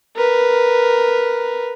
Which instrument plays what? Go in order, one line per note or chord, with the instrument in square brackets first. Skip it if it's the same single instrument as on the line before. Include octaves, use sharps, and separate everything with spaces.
[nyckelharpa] A#4 B4